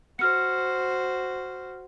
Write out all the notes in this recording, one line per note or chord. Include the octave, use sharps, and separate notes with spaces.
F#4 C5 F6 C#7